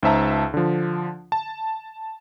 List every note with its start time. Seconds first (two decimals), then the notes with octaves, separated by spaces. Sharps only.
0.03 C#2 D#4 C5 E5 A5 A#5
0.54 D3 F3
1.32 A5